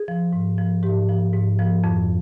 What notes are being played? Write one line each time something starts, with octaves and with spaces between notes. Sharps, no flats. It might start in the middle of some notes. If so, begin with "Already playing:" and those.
Already playing: G#4
F3
G#2
F3
G#2 G4
F3
G#2
F3
F2